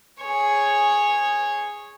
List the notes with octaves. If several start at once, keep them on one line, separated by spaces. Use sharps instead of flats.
G#4 C#5